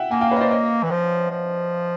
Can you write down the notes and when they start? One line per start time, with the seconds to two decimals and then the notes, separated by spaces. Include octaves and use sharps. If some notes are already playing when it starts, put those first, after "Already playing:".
Already playing: E5 F#5 G5
0.11 A#3 F#5 G#5
0.21 F5 G5
0.31 B4 C#5
0.37 D#5
0.41 C5 D5
0.51 C#5 D#5
0.83 E3
0.91 F3
1.31 F3